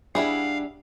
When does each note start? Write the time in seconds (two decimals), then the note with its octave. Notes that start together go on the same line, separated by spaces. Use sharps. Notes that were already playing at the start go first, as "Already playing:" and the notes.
0.15 G3 D4 E4 G#4 F5 F#5